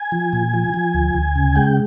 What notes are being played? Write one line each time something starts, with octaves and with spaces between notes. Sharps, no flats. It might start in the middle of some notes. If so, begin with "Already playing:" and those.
Already playing: G#5
F3
A#2
F3
F3
D2
D2
C#3
G#3 G5